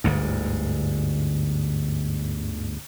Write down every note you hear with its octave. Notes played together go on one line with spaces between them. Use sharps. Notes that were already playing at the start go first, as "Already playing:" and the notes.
G1 D2 G#2